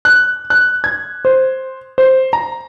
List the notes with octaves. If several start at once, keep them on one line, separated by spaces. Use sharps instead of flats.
F#6
F#6
G#6
C5
C5
A#5